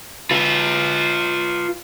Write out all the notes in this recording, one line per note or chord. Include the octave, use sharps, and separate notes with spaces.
F4 B4